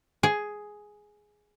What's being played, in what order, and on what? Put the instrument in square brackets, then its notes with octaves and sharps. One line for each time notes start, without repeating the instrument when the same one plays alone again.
[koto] G#4